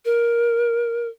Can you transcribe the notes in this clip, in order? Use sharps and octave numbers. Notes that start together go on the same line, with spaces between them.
A#4